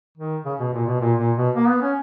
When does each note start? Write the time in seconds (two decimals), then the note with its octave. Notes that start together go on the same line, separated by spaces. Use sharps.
0.18 D#3
0.45 C#3
0.60 B2
0.73 A#2
0.87 B2
1.00 A#2
1.18 A#2
1.37 B2
1.55 A#3
1.68 B3
1.82 C#4